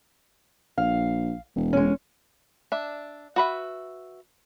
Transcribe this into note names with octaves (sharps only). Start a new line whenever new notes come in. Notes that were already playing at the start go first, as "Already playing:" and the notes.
A#1 F5
E1
G#3 C#4
D4 E5
F#4 B4 E5